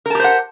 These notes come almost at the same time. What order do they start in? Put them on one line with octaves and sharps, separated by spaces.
A#4 A5 G4 C5 F#5